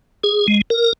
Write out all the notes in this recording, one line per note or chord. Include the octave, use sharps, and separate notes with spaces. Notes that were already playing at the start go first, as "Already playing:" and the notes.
G#4
G#3
A#4